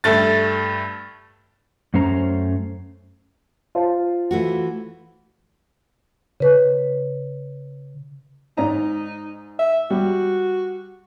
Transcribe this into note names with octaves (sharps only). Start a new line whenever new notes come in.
G2 A3 A6
F#2 A3 C#4 C5 A#5
F4 C5 A5
E3 A3 F#4
C#3 B4
G#2 D#4 D5 A#5
E5
G3 F#4